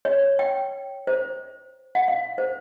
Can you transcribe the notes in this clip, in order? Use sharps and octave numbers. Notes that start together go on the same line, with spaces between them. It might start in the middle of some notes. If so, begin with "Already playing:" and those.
C#5
G5
C5
F#5
F5
C5